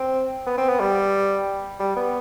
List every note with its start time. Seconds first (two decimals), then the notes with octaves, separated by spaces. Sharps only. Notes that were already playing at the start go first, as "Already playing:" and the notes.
Already playing: C4
0.46 B3
0.58 C4
0.68 B3
0.79 G3
1.80 G3
1.96 B3